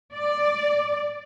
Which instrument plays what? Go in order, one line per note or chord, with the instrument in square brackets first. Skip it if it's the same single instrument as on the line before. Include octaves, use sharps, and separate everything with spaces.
[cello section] D5